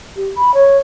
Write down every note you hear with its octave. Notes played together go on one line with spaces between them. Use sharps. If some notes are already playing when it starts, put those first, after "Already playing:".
G4
B5
C#5